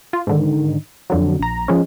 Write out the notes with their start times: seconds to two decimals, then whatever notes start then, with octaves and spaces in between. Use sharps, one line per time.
0.13 F4
0.27 G#2 D3 D#3
1.10 F2 D3 F#3
1.39 A#1 A#5
1.68 F3 G#3 C#4